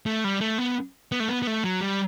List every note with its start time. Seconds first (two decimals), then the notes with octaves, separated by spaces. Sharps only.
0.06 A3
0.24 G3
0.41 A3
0.58 B3
1.12 B3
1.20 A3
1.28 B3
1.42 B3
1.47 A3
1.64 F#3
1.81 G3